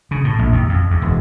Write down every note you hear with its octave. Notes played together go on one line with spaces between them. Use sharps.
C#3
A2
A#1
D#2
F2
E2
E1